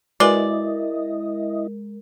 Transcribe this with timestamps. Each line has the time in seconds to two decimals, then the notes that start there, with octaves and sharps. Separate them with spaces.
0.20 G#3 E4 F#4 A#4 B4 D5 D#5 G#5